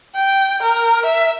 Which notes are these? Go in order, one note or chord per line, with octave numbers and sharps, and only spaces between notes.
G5
A#4
E5